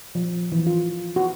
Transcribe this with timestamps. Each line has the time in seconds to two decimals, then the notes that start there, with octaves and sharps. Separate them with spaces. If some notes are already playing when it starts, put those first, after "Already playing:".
0.15 F3
0.52 E3
0.67 F4
1.16 F#4